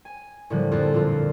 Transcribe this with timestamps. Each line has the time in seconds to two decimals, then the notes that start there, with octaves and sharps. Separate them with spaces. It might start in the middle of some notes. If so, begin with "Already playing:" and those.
0.05 G#5
0.50 A2 D3 F3 G3 A#3
0.72 F2 F4 A4 F#6
0.94 A#2 F3 F4